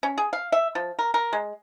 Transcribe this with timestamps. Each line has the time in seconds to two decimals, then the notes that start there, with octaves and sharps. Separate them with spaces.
0.03 C#4
0.18 G#4
0.33 F5
0.52 E5
0.75 F3
0.99 A#4
1.14 A#4
1.33 G#3